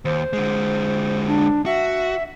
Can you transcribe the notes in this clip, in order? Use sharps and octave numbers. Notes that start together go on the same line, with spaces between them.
D#2 C5
D3 G#3
D4
F#4 E5